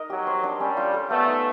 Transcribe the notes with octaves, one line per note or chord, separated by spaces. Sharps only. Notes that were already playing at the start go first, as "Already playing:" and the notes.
Already playing: D#4 A#4 D#5
F#3 G4
C5
D4
G3 C#4
F4
A4
A3 B3
D#4